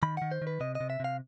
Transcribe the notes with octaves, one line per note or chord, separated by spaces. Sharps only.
D#3 B5
D#3 F#5
C5
D#3
B4
C3 D#5
D#5
C3
E5
C3 F5